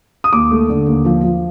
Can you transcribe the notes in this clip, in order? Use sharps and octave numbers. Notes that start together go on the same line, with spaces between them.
D#6
D#2 D6
A3
D3
D#2
F3
F3